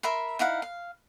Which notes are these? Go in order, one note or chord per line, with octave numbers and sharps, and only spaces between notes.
A#4 E5 B5 C6
D#4 E4 F5 F#5
F5